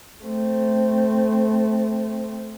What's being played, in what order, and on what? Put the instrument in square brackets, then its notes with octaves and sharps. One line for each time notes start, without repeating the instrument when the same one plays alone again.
[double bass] A3 C4